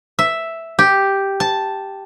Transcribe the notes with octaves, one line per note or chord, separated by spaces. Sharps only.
E5
G4
A5